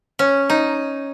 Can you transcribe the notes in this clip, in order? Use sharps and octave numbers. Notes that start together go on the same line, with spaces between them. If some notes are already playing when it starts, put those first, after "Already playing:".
C#4
D#4